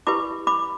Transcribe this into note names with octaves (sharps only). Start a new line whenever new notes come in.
E4 G4 B4 B5 D6
B5 D6